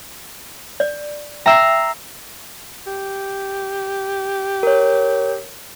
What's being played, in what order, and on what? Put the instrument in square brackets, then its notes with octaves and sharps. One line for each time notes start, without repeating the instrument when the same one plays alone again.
[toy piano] D5
[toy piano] E5 G5 [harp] A#5 E6 C7
[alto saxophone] G4
[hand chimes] A#4 C#5